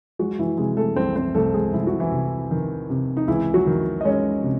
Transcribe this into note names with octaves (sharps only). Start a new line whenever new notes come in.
F#3 G#3 F#4
E3 E4
C3 G#3 G#4
A3 A4
C2 C4 C5
C4 C5
C2 A3 A4
G#3 G#4
C2 E4
F#4
E3 E4
C3
D#3
C3
D#4
C#2 E3 E4
F#3 F#4
D#3
D#5
G#3 C#4 C#5
C3